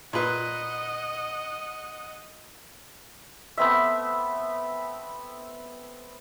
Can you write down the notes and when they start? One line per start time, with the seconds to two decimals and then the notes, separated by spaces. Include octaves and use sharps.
0.13 A#2 B4 D#5 F#5
3.58 A3 B3 C4 E5